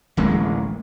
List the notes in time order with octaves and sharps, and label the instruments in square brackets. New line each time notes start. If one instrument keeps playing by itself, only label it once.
[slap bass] D1 A1 G#3 A#3